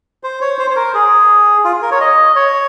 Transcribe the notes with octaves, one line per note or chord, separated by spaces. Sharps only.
C5
C#5
C5
C5
A#4
G#4
F4
A#4
C#5
D#5
C#5